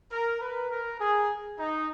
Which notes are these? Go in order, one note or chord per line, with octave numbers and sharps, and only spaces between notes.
A#4
B4
A#4
G#4
D#4